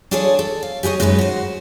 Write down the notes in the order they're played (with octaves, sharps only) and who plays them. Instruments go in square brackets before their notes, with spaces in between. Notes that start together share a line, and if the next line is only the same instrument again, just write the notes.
[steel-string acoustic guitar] D4 F4 G#4 A4 C#5 D5
A4
F5
G4 G#4 A#4 C#5 D#5
F#2 G#3 D#4 G4 B4
F#4 C5